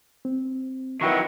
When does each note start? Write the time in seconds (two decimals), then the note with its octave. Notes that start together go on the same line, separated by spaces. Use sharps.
0.25 C4
1.01 D#3 F#3 E4 F#4 B4 G5 C#6